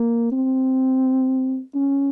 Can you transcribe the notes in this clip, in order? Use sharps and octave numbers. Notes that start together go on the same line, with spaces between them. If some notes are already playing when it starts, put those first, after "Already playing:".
Already playing: A#3
C4
C#4